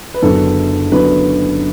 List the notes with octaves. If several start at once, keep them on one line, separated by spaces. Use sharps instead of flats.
B4
F#1 F#2 D3 F#3 B3 A4
F#1 F#2 D3 F#3 B3 B4